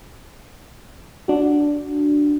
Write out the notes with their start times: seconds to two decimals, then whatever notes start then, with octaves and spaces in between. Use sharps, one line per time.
1.28 D4 F#4